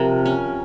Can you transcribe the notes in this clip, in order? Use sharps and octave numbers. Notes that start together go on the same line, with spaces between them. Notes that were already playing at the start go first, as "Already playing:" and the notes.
Already playing: C3 F3 A#4
C#4